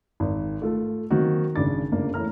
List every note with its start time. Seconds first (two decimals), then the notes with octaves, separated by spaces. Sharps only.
0.20 G#1
0.62 A3 F4 A4
1.11 D#3 F#3 A#3 C4 F#4
1.56 G#1 C#3 D4 D6 A6
1.92 G1 C#3 A#3 D4
2.14 E2 A3 E4 C#5 A#5 F6